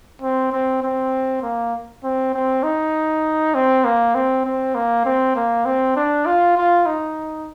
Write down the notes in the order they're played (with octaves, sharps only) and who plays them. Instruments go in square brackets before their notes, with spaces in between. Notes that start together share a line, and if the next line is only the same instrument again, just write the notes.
[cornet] C4
C4
C4
A#3
C4
C4
D#4
C4
A#3
C4
C4
A#3
C4
A#3
C4
D4
F4
F4
D#4